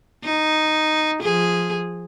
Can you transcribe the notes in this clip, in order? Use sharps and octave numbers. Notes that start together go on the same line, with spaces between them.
D#4
F3 G#4